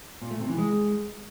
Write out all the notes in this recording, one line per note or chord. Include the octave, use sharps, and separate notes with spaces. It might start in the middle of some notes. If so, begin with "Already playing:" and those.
A#2
A3
C3
E3
G#3